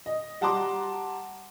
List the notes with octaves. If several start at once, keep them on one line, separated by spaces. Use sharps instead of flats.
D#5
G3 F#5 A5 A#5 C6 D6